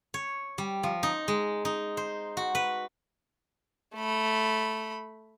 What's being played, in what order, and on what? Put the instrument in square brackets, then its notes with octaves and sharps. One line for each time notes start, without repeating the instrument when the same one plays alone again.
[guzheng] C#5
G3
F3
D#4
G#3
D#4
C5
F#4
B4
[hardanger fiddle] A3 B5